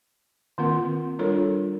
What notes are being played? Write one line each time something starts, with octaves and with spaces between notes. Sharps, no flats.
D#3 A#3 C4 F4 A#4 F#5
G3 D4 F4 A4 A#4 C#5